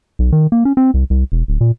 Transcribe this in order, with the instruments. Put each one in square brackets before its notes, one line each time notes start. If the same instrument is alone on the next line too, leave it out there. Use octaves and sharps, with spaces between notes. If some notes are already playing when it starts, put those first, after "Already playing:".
[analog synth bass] B1
D#3
A#3
C#4
C4
C2
C2
E1
D1
A#2